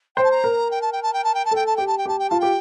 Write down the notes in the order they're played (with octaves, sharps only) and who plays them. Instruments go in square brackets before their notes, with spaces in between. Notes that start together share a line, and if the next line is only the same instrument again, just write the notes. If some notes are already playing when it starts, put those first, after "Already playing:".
[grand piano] C5 [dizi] G5
[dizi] A5
A#5
[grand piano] A#4
[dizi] G5
A5
G5
A5
G5
A5
G5
A5
[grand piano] A4 [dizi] G5
[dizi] A5
[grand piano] G4 [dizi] G5
[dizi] A5
G5
[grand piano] G4 [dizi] A5
[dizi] G5
[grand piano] F4 [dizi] A5
[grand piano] G4 [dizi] G5